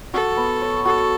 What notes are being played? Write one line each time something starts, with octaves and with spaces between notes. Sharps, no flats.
F#4 A4
B3
C#5
F#4 A4